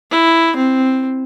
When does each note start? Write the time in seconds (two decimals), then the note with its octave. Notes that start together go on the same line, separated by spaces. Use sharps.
0.11 E4
0.56 C4